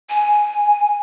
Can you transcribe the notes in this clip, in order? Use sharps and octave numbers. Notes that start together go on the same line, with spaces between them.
G#5